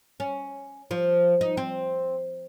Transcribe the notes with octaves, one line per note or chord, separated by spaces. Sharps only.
C#4
F3
D#4
C4